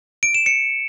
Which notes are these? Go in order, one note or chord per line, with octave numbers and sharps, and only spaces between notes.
D7
E7
C#7